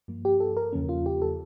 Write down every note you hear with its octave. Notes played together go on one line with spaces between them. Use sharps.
G2 F3 A#3
G4
A4
A#4
E2 C#3 F3 A#3 C#4
F4
G4
A4